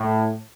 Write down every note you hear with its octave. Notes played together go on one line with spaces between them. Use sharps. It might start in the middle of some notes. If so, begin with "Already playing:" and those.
Already playing: A2